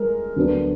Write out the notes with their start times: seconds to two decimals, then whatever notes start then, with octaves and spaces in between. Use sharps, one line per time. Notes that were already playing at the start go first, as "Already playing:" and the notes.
Already playing: G#3 A#4
0.36 D2 D3 F#3 B3 D4